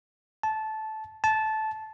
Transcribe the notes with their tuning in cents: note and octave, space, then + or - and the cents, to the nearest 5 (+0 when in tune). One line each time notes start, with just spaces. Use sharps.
A5 -15
A5 -15